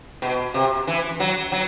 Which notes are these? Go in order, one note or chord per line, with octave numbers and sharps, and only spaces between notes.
B2
C3
E3
F#3
F#3